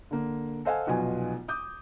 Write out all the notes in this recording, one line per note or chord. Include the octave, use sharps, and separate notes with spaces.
D3 A#3
A4 C5 D#5 F5 F#5 G#5
F1 B1 B2 F4 G#5
D6 D#6 G6